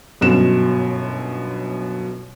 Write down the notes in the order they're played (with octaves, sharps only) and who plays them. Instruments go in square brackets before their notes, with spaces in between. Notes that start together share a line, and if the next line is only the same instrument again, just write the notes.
[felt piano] G1 F#2 B2 E7